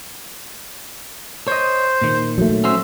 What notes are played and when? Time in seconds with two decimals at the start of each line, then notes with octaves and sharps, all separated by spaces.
1.48 C5 C#5 D#5
2.02 A#2 D#3
2.38 F#3 G3 A3
2.64 C#4 F#4 C5 E5